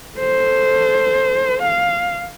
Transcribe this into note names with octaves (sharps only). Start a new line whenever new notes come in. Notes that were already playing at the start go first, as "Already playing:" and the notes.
A4 C5
F5